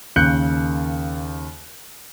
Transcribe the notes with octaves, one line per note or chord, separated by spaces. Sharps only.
D#2 C#3 F#6 G6 C#7